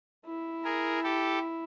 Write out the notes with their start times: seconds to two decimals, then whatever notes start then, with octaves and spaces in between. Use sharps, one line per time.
0.26 E4
0.64 G#4 A#4
1.03 G4 A4